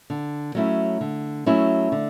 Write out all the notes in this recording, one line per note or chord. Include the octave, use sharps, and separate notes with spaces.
D3
F#3 A3 C#4 E4
D3
F#3 A3 C#4 E4
D3